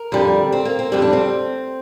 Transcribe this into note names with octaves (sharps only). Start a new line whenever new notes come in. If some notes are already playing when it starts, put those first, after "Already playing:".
Already playing: A#4
F2 D3 G3
C4
A#3
C4
F2 D3 G3 C4
D4
C4